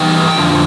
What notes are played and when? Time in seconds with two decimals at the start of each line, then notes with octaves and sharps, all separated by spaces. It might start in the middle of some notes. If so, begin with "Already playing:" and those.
Already playing: E3 G3 B3 D#4 G5
0.38 F2 D3 F3